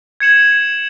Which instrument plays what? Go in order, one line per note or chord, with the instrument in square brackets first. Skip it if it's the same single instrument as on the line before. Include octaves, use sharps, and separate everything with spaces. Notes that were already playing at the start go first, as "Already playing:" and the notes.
[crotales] G#6 C#7 E7 F#7